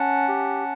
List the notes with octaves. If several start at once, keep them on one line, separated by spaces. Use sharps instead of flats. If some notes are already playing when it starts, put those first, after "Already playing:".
Already playing: C#4 F#5 A5
G4